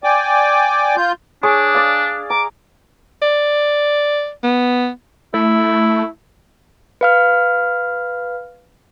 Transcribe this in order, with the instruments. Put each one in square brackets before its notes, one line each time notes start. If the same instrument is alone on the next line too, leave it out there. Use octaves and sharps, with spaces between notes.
[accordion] D5 G5 G#5 D6
F4 G6
[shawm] D4 [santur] G#4 C#5 D6
[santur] D5 F5
[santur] A#5 [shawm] D6
[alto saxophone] D5
B3
[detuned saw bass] A3 [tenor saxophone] E4
[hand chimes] B4 F5 F6